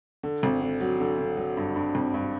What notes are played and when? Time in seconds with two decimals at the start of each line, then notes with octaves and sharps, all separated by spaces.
0.23 D3
0.43 G#1
0.61 D3
0.81 F#3
1.00 D3
1.19 D3
1.37 F#3
1.57 G2
1.76 G2
1.95 G#1
2.14 G2